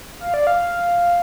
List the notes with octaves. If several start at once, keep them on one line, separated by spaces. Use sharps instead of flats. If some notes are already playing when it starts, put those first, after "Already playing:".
F5
D5
F5